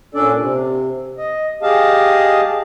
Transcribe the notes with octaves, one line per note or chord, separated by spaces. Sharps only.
A#2 C#4 D4 A4 D5
C3
D#5
G4 G#4 D#5 F5 A5